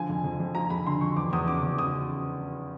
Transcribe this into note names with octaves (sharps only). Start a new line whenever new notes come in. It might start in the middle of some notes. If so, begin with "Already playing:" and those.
Already playing: D3 F3 G#5
F2
F2
F2
F3 A#5
F2 B5
D3 C6
F2 C#6
E2 D6
E2 D#6
C#3 D6
E2 D6
C#3 D#6